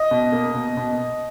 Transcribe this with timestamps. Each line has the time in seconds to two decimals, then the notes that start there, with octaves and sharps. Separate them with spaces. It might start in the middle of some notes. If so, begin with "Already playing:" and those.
Already playing: D#5
0.11 B2
0.32 A#3
0.54 B2
0.77 B2